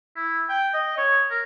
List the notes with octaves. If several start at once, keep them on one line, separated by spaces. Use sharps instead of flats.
E4
G5
D#5
C#5
A#4